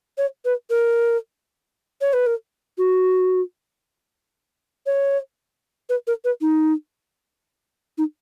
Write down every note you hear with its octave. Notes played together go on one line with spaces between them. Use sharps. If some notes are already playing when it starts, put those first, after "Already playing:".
C#5
B4
A#4
C#5
B4
A#4
F#4
C#5
B4
A#4
B4
D#4
D#4